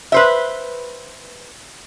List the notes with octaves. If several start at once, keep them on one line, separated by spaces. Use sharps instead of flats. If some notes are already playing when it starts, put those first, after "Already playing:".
B4 C5 E5